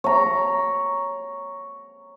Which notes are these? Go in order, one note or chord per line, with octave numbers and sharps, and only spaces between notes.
C#5 A#5